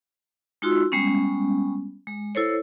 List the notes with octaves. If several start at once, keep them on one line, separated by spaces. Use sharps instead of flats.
G#3 D#4 F4 F#4 C6 E6
G3 G#3 B3 C#4
G#3
E4 A4 C5 C#5